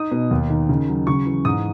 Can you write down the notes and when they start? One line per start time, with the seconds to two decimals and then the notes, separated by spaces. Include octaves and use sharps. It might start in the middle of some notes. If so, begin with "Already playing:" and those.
Already playing: D#4 D#6
0.11 B2
0.31 D#2
0.50 D#3
0.69 C#3
0.88 F#3
1.07 C#3 C#6
1.27 E3
1.45 G#2 D#6